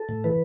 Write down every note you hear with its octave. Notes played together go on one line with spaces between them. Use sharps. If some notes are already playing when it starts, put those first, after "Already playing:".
Already playing: A4
A2
E3 B4